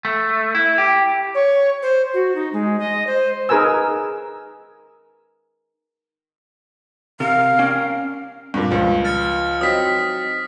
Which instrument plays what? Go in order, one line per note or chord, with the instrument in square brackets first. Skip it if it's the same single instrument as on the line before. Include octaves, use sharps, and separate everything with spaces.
[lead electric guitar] A3
E4
G4
[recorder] C#5
C5
F#4
D#4
G#3
D#5
C5
[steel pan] D#4 G#4 A#4 B4 G#5 E6
[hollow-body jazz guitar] C3 [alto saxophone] A#4 [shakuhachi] F5
[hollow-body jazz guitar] C#4 D5 G5
[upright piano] G2 A#2
C#2 F3
[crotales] F6 A6 C#7
[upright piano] F#3 C4 D#4 [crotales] D#6 B6